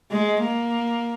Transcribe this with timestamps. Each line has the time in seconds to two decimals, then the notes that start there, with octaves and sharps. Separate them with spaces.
0.11 G#3
0.42 A#3